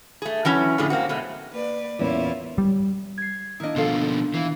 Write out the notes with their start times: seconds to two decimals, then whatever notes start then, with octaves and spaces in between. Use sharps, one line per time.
0.22 A3 G#4
0.45 E3 F#3 C#4 E4
0.78 F2 A2 D3 A3 G#4
0.90 A#3 C4 F#4
1.09 B2 G#3 A3
1.52 A#3 B4 D5
1.99 E2 A#2 A#3 C#4 E4 F4
2.58 G3
3.18 G#6 C7
3.60 D#3 A#3 D4 E4 D#5
3.76 B2 F3 F4 A4 F5
4.34 E3 F5